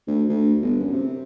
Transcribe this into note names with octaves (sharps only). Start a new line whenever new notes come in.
D2
D2
G1
F#2
C3